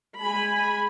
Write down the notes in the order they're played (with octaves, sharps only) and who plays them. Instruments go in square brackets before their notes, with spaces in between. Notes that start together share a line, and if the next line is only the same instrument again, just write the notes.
[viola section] G#3 B5 [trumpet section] G#5